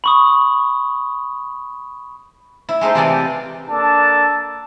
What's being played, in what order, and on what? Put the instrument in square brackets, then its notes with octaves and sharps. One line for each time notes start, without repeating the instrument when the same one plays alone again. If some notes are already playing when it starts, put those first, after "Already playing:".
[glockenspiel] B5 C#6 D#6
[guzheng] E4
G#3 A3 D#4 C5
C3 E3 F4 A4 D5 G#5
[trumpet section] A#3 D4 A4 A5